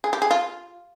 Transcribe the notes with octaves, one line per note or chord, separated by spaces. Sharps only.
G#4
G4
G#4
F4